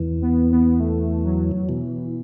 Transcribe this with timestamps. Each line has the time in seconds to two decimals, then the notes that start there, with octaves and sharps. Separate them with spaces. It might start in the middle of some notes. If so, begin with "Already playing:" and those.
Already playing: E2 E3
0.22 B3
0.52 B3
0.80 A3
1.25 F#3
1.68 B2 E3